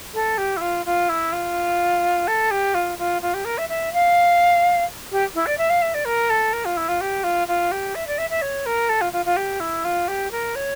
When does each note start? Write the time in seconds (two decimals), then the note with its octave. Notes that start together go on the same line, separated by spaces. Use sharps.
0.14 A4
0.38 G4
0.57 E4
0.61 F4
0.86 F4
1.09 E4
1.32 F4
2.28 A4
2.51 G4
2.74 F4
2.98 F4
3.22 F4
3.34 G4
3.45 A#4
3.58 E5
3.69 E5
3.93 F5
5.12 G4
5.35 E4
5.46 D5
5.58 E5
5.70 F5
5.82 E5
5.94 D5
6.05 A#4
6.30 A4
6.53 A#4
6.65 F4
6.77 E4
6.88 F4
7.01 G4
7.24 F4
7.48 F4
7.72 G4
7.95 E5
8.07 D5
8.18 E5
8.30 E5
8.42 C#5
8.66 A#4
8.89 A4
9.01 F4
9.13 F4
9.25 F4
9.37 G4
9.60 E4
9.85 F4
10.08 G4
10.31 A#4
10.56 C#5